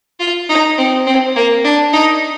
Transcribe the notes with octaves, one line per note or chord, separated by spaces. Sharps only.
F4
D#4
C4
C4
A#3
D4
D#4